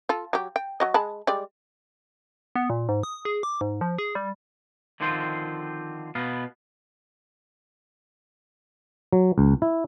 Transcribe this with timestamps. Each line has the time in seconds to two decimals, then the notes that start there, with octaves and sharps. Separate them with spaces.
0.09 F4 A4
0.33 F#3 G4
0.56 G5
0.80 F#3 F#4 D#5
0.94 G#3 A5 B5
1.27 G3 G#3 D5
2.55 B3
2.70 A#2
2.89 G#2
3.03 D#6
3.25 G#4
3.43 D6
3.61 G#2
3.81 F3
3.99 G#4
4.15 G3
5.00 D3 D#3 F3 C4 F4 C5
6.15 B2 B3 F5
9.13 F#3
9.38 C#2
9.62 E4